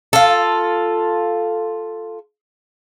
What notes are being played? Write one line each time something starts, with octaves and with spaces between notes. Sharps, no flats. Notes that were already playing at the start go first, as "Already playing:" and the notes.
F4 A4